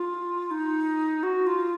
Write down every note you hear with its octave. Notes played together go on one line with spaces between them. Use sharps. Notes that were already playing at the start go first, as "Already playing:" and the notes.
Already playing: F4
D#4
F#4
F4